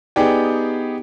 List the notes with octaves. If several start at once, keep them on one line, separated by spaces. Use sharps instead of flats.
B3 D#4 G4 G#4 D5 G5